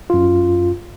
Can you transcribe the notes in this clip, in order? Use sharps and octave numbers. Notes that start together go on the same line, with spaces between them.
F#2 F4